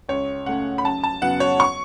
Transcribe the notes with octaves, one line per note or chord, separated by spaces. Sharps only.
C#2 C#5
C#3 A3 C#4 F#5
B5
F#2 A5
A5
C#3 F#3 B3 F#5
C#5
C#6